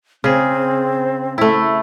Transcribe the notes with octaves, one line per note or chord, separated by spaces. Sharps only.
C#3 C4 G#4
A3 E4